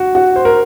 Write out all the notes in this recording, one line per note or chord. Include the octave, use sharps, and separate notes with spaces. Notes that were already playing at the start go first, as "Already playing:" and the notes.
Already playing: F#4
F#4
C5
A#4